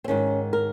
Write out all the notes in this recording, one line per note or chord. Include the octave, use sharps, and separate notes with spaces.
C4
G#2 D#3 C#4
A#4